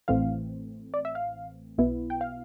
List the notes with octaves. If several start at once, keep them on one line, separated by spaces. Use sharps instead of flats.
A1 A2 E3 A3 C4 F5
D5
E5
F5
B1 B2 B3 E4
G5
F5